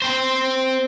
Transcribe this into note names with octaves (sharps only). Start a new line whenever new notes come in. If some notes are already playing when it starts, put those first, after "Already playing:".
C4 C5